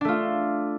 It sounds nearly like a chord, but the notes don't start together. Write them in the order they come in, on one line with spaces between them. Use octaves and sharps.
D4 A3 F4